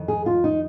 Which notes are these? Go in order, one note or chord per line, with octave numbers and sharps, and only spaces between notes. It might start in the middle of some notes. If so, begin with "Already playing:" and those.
Already playing: F2 D#3
G#4
F4
D#4